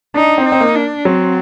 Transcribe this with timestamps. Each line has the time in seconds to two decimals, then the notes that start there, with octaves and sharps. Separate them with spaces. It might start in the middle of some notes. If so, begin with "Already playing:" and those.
0.14 D4 D#4
0.38 C4
0.45 D#4
0.52 C4
0.61 A#3
0.75 D4
1.05 F#3 C4